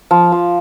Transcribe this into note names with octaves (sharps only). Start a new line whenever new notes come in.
F3
F3